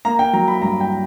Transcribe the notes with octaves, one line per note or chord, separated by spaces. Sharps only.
A#3 A#5
G5
F#3 A#5
B5
G2 A#5
G5